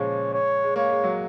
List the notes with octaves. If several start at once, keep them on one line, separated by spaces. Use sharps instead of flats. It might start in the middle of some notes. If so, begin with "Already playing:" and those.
Already playing: A#2 C#3 F3 G#3 C#5
C#5
G#3
A#3 C#5
G#3
F#3